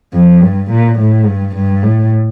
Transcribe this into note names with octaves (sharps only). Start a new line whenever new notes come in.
F2
G2
A#2
A2
G2
G2
A2